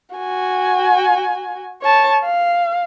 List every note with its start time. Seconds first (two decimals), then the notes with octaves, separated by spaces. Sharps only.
0.16 F#4 G#5
1.82 C#5 A5
2.24 F5